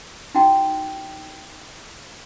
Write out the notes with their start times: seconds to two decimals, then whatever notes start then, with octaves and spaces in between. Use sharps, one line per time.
0.34 D#4 E4 F#4 G5